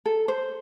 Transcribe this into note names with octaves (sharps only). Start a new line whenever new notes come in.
A4
C5